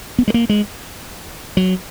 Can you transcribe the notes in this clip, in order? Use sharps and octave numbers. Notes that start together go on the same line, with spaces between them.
B3
G#3
A#3
G#3
F#3